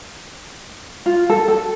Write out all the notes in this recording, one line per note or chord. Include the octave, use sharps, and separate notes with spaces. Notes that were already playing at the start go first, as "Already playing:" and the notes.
F4
A4
A4